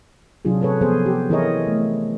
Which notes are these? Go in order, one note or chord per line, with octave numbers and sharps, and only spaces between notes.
C3 F#3 D4 F4 G#4
G#4 A4 B4 C#5
F3 B3 G#4 A4 C5
G4
E3 E4 G#4 A#4 C#5 D#5
A3